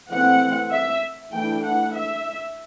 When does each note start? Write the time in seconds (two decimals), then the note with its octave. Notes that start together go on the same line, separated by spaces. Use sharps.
0.11 E3 A3 C4 F#5
0.71 E5
1.32 E3 A3 D4 G5
1.63 F#5
1.93 E5